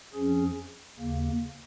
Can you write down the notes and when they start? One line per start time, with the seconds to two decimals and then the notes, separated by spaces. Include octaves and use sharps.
0.13 F2 F3 C#4 G#4
0.99 D#2 C#3 A#3